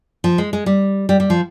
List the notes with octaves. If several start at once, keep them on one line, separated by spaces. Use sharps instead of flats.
F3
G#3
G#3
G3
G3
G3
F3